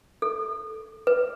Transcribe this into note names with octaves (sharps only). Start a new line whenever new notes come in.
A4
B4